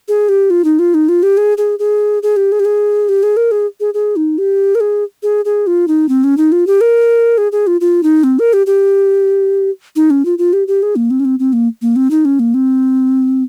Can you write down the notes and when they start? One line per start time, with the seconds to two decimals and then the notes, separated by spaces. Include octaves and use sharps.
0.08 G#4
0.29 G4
0.50 F4
0.65 D#4
0.79 F4
0.94 D#4
1.09 F4
1.23 G4
1.37 G#4
1.58 G#4
1.79 G#4
2.23 G#4
2.36 G4
2.52 G#4
2.60 G4
2.65 G#4
3.09 G4
3.23 G#4
3.37 A#4
3.51 G#4
3.80 G#4
3.94 G#4
4.16 D#4
4.38 G4
4.75 A#4
4.80 G#4
5.23 G#4
5.45 G#4
5.67 F4
5.88 D#4
6.09 C4
6.24 C#4
6.37 D#4
6.52 F4
6.67 G4
6.81 A#4
7.38 G#4
7.52 G#4
7.67 F4
7.81 F4
8.03 D#4
8.23 C4
8.39 A#4
8.53 G4
8.66 G4
9.96 D#4
10.10 C#4
10.25 F4
10.38 F4
10.53 G4
10.68 G4
10.82 G#4
10.96 A#3
11.10 C4
11.20 C#4
11.25 C4
11.39 C4
11.53 A#3
11.82 A#3
11.96 C4
12.11 D#4
12.25 C#4
12.39 A#3
12.54 C4